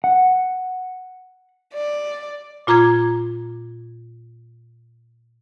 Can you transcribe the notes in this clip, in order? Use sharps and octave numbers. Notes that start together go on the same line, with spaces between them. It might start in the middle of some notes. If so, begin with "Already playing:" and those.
F#5
D5
A#2 F4 A#5 D6 G#6